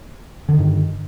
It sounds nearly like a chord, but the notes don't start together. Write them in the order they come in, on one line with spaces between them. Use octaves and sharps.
D3 D#3 G2